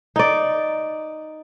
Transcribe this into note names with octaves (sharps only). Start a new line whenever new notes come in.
D#4 D5